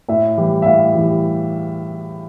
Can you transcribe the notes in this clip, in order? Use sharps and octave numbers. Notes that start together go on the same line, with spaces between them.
A2 E5
E3 G3
E5
A2 F5
E3 G3